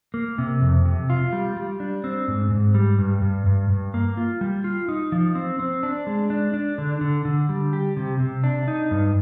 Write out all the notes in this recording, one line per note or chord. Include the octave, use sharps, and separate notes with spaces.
A#3
C3
F2
C3
F4
G3
G3
D4
C4
G#2
G#2
G3
G2
G2
G2
G2
A#3
F4
G3
F4
D#4
F3
C4
C4
D4
G#3
D4
D4
D3
D3
D3
G3
G4
C3
C3
D4
D#4
G2